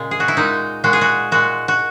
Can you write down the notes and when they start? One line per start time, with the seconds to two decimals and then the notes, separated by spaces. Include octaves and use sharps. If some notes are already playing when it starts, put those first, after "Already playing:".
Already playing: A#2 C#3 G#3
0.11 G#4
0.20 F#4
0.28 E4
0.37 A#2 G#3 D#4
0.84 A#2 G#3 F#4
0.93 G#4
1.01 F#4
1.31 A#2 G#3 F#4
1.68 F#4